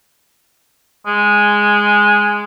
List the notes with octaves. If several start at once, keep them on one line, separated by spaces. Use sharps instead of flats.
G#3